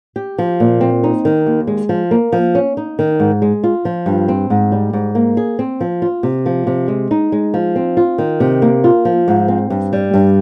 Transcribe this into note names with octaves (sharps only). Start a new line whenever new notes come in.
G4
F3
A#2
C4
D#4
D#3
D#2
G#3
F3
A#3
F3
C#4
D#4
D#3
G#2
G#3
F4
F3
G2
C4
G#2
G3
G#2
A#3
G#4
C4
F3
F4
C3
F3
C3
G#3
D#4
G#3
F3
C4
F4
D#3
C3
A#3
F4
F3
G#2
C4
G2
G3
G2